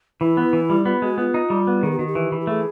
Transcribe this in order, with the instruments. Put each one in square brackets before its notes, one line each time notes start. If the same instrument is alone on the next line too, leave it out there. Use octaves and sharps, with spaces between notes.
[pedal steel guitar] E3 [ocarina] E4
[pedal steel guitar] B3
E3
G3
[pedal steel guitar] B3 [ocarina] F4
[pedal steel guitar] G#3 [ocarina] F#4
[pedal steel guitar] B3 [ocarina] F4
[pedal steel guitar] D#4
G3
B3
[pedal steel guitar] D#3 [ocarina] G#4
[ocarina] G4
[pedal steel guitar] D#3 [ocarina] F#4
[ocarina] G4
[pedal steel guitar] E3
E3
[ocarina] G4
[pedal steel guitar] A3 [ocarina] G#4